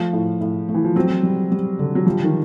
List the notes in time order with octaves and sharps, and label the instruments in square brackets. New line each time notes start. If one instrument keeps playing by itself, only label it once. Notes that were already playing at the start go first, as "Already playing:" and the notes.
Already playing: [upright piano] F3 [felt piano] A3
[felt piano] A2
A2
A3
[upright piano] E3
F3
[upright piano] F#3 [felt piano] C4
[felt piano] G3
G3
D3
[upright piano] F#3
[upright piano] F3 [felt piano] G3
[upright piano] D#3